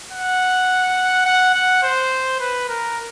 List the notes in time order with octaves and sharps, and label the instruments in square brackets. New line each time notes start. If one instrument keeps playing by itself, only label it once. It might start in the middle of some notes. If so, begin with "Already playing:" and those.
[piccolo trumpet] F#5
F#5
F#5
C5
B4
A#4